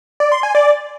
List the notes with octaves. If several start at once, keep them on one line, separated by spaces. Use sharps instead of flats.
D5
C6
G#5
D5